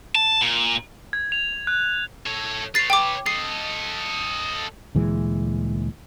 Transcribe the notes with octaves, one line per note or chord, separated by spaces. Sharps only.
A5
A#2
G#6
F7
F#6
A4 C#5
B4 C#5 A6 C7
G5 D6
A4 D#5 C7
D2 A#2 E3 G#3